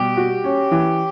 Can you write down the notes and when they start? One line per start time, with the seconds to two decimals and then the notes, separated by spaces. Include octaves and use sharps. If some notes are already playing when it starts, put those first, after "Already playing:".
Already playing: B2 G3 G4
0.17 F#4
0.44 C#4
0.71 E3